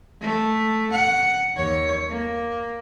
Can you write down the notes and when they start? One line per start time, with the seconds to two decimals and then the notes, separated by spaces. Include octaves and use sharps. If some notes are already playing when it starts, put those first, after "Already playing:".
0.21 A3
0.92 F#5
1.55 D#2 C#5
2.09 A#3